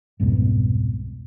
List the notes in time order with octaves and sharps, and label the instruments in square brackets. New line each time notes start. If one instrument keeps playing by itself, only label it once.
[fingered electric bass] C2 F2 G#2 B2